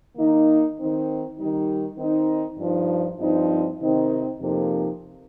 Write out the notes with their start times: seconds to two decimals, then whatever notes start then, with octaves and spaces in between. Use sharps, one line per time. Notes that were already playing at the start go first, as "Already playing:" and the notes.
0.16 D#3 A#3 D#4
0.77 D#3 C4 D#4
1.37 D#3 G3 D#4
1.98 D#3 C4 D#4
2.59 G2 F3 D#4
3.19 G2 F3 C4 D#4
3.81 C3 D#3 C4 D#4
4.41 F2 C3 F3 A#3 D#4